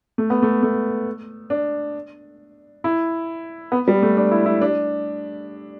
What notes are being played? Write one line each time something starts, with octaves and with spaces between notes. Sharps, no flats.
A3
B3
A3
A3
D4
E4
B3
G3
A3
D4
E4
E4
D4